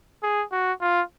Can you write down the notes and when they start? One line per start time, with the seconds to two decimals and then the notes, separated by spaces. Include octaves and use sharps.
0.23 G#4
0.52 F#4
0.81 F4